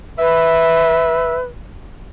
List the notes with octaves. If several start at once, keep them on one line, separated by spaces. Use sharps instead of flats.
B4 E5